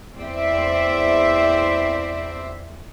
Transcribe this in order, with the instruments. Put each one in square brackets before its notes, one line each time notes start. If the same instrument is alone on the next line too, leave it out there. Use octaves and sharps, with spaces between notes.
[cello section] E2 C4 C5 D5 E5